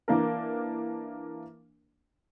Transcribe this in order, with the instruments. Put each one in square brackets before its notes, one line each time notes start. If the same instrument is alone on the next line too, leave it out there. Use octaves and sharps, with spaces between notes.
[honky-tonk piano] E3 A#3 D4 A#4